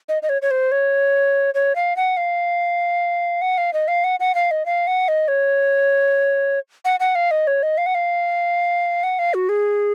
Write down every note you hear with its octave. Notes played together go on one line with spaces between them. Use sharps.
D#5
D#5
C#5
C#5
C5
C#5
C#5
F5
F#5
F5
F#5
F5
D#5
F5
F#5
F#5
F5
D#5
F5
F#5
D#5
C#5
F#5
F#5
F5
D#5
C#5
D#5
F5
F#5
F5
F#5
F5
F#4
G#4